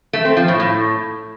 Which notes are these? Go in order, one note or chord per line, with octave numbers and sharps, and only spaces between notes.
A3
C4
F3
A2
A2